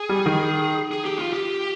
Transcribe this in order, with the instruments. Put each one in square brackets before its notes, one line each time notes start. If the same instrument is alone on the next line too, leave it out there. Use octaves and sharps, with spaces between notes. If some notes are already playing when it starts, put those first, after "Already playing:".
Already playing: [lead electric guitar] G#4
[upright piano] G3
D#3
[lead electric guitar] G#4
G4
F4
G4